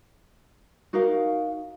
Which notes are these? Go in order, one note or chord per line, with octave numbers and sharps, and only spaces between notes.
D#4 F#4 A#4 F5